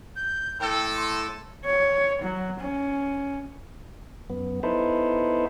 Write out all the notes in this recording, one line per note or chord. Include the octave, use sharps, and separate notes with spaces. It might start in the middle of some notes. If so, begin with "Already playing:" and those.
G6
A2 A4 G5
C6
C#5
F#3
C#4
F#2 B3
B3 D#4 E4 A4 B4 C5